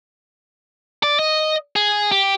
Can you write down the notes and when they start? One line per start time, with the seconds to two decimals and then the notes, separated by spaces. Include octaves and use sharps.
1.03 D5
1.19 D#5
1.76 G#4
2.12 G4